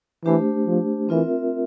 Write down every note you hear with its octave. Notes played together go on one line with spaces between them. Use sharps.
E3 A3 D4 G4 C5
F3
E3 C4 F4 A#4 E5